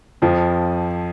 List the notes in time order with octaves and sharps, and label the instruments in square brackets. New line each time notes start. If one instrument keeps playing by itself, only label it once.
[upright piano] F2 F3